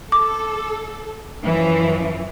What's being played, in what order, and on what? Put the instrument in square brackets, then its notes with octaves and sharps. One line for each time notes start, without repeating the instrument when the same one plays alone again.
[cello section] A4 [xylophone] D6
[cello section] F#2 E3 F3